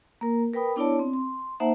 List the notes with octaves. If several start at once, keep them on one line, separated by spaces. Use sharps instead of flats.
A#3 A#4
A#4 B4 G5 B5 D#6
B3 D4 E4 C#5 D5 A5
C4
C6
A#3 D#4 C5 E5 F#5 A5